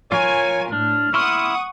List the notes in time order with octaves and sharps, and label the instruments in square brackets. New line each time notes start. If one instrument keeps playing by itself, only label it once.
[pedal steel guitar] F4 A#4 [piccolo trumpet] C#5 [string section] G#5
[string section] A2 [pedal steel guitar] D4 [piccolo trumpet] F6
[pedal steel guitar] E4 C6 F6 [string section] F#5 D#6 [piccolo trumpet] C#6